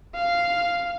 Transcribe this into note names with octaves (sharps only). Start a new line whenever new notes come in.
F5